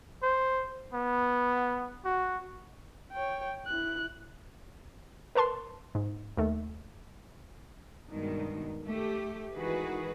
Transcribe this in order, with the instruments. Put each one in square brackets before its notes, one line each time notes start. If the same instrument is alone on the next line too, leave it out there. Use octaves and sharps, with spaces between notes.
[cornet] C5
B3
F#4
[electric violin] C#5 G5
E4 F#6
[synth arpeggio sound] A#4 B4 A5 C6
G#2
D#2 A3
[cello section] G2 B2 D#3 G#3
A3 G4
D#3 E3 G#3 F#4 G#4 B4